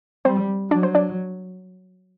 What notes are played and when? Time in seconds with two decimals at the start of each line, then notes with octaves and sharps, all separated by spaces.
0.25 G3 C4 C5
0.71 F#3 D4 D5
0.83 C5
0.95 D4 D5